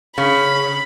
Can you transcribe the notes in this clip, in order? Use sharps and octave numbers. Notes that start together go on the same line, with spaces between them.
C#3 B5